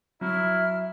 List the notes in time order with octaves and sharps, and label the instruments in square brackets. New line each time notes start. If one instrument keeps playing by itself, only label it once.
[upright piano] F#3 [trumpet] E4 [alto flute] E5 [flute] F6